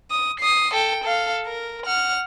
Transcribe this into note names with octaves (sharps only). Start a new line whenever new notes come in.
D#6
D#6 C7
A4 G5
A4 F5
A#4
F#5 F6